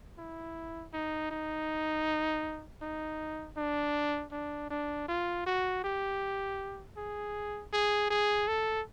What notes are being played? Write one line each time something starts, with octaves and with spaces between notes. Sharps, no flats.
E4
D#4
D#4
D#4
D4
D4
D4
F4
F#4
G4
G#4
G#4
G#4
A4